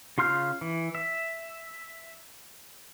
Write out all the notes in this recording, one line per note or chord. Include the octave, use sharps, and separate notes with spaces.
C#3 F4 C6 F6 G6
E3
E5